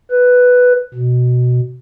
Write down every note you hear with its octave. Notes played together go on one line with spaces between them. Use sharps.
B4
B2